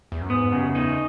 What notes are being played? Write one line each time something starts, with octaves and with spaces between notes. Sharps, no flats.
E2
F#2
G#2 B3
F#2 C#3
E2 D#4